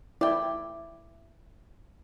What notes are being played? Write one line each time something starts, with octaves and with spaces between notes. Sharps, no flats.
E4 D5 G5